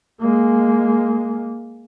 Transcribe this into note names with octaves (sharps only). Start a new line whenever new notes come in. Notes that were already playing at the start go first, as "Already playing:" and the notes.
G#3 A#3